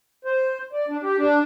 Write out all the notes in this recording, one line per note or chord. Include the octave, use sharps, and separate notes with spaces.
C5
D5
D4
G4
D4